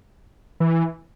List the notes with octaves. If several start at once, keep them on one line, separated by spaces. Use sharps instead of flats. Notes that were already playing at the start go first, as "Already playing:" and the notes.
E3